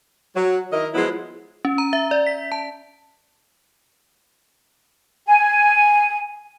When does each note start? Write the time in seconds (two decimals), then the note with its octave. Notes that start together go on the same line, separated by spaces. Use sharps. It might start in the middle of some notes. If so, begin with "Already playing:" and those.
0.36 F#3
0.72 D#3 E4 A#4 D#5
0.94 F3 F#3 G#3 B3 E4
1.65 C#4
1.78 A#5
1.93 E5
2.11 D5
2.27 B6
2.52 A5
5.27 G#5